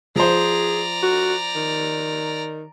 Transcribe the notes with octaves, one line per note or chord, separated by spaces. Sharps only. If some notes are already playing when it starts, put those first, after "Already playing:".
F3 G#4 C5 D5 A#5
F#4
D#3